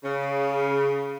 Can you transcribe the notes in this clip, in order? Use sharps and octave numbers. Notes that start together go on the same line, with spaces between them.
C#3